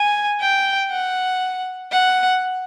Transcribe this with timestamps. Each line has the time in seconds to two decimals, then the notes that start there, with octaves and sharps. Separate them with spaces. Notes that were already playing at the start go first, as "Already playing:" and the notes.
Already playing: G#5
0.41 G5
0.91 F#5
1.92 F#5